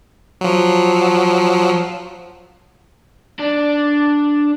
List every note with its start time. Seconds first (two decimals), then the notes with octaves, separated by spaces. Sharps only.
0.41 F3 F#3
3.40 D4